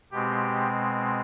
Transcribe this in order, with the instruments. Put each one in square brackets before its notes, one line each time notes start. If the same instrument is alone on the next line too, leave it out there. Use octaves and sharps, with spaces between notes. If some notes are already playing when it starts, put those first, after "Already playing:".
[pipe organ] B2 G#3 C4 G4